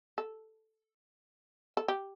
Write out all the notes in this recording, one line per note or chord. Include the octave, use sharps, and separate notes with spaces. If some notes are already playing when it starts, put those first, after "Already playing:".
A4
A4
G4